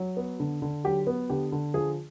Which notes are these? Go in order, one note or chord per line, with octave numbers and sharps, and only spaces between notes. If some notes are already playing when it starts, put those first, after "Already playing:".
Already playing: F#3
B3
D3
D3
F#3 G4
B3
D3 G4
D3
F3 G#4